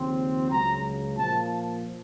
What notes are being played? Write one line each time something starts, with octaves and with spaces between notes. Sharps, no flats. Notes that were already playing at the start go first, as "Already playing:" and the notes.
Already playing: D#2 C#3 F3 C4
C#2 C#3 F#3 A#5
A#2 F3 A#3 A5